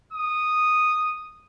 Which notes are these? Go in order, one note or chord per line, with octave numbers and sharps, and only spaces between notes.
D#6